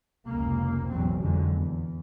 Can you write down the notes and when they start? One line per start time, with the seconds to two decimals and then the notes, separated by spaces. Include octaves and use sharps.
0.27 F1 C#2 A#3
0.90 A1 E2 B2 F#3 C4
1.21 F2 D3 F#3 G#3
1.54 E2